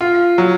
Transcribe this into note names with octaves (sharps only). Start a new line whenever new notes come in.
F4
F#3